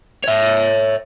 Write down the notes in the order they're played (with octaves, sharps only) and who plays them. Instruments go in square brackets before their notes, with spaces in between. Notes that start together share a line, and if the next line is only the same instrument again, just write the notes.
[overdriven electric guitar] C#5 E5